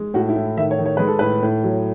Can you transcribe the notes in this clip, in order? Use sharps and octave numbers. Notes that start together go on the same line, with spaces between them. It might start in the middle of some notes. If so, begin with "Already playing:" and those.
Already playing: G#3
A2 F#4
E4
A2
D#3 E5
C#5
D#3
C#5
G#3 B4
A4
A2 B4
A2
F#3